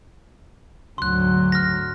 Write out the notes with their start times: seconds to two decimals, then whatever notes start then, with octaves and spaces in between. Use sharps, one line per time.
0.98 D2 G#2 F#3 C6 F#6
1.52 F6 A#6